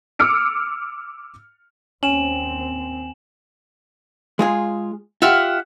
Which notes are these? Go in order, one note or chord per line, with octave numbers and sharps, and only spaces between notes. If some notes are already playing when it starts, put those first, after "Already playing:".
D6 E6 F6 C#7 D7
D#2 C4 C#4 G#5 E7 F#7
G#3 F4 G#4
F4 G4 E5 F#5 F6